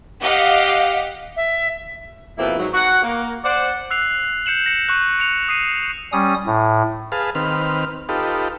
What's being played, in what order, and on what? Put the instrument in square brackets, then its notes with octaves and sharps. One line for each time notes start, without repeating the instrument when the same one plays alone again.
[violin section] G4 D#5 F5 F#5
[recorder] E5
[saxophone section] F2 B2 A#3 C4 E4 B4
G#2 F#3
F#3 F#4 F#5
A#3
C5 D5 F#5
[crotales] E6 F#6 C7 F7
G6 C#7 E7 F#7
A#6 C#7
C#6 F#6
C#7 F7
D#6 C7 D#7
[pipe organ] G3 C#4 D#6
A2
[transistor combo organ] G#4 B4 F5 A5
D#3 C4 B4 F6
D#4 F4 G4 A4 B4